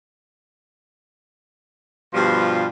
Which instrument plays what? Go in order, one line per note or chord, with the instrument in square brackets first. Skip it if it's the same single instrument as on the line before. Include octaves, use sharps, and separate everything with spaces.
[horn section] G2 B2 F3 G3 F4 C6